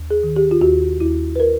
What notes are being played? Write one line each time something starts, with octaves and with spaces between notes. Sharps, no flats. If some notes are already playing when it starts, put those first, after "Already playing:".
Already playing: D#2
G#4
D#3
G4
F4
D#2 F#4
D#2 E4
B4
A#4